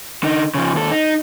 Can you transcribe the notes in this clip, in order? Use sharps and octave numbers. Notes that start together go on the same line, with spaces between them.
D3 D#4
C#3 F3
D#2 A4
D#4